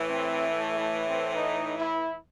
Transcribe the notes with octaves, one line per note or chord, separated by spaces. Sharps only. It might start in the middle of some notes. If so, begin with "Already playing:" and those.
Already playing: A2 E3
C4
A3
A3
C4
D#4
E4